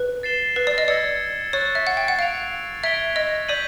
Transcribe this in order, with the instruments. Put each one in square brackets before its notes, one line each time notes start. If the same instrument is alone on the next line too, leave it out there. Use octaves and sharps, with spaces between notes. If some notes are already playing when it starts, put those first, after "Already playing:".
Already playing: [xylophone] B4
[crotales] A6 C7 E7 G7
[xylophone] B4
D5
D#5
[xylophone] D5 [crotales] E6 G#6 C#7
[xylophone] C#5 [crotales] C#6 F#6 A6
[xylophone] E5
F#5
G5
F#5
[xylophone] F5 [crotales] A6 D7 F7
[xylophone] E5 [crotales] G#6 B6 D7 G7
[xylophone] D#5
[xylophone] D5 [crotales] G6 B6 D#7 F#7